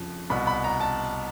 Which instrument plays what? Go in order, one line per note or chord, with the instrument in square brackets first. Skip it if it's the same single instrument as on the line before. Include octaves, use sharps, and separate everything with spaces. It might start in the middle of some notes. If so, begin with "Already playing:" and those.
Already playing: [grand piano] F2 C#3 F3
C2 B2 B5
B5
A#5
A5